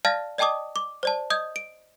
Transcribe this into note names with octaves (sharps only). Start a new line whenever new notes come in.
D5 F5 A5 F6 A6 A#6
D5 D#5 G5 A5 D6 D#6
D6
C5 D5 A5
D#5 D#6 G6 G#6
D7